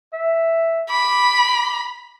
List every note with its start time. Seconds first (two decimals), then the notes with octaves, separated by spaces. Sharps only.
0.13 E5
0.90 B5 D6